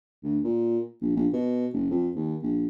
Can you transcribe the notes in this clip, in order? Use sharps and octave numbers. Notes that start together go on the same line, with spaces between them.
D2
A#2
A#1
A#1
B2
F#1
F2
D#2
A#1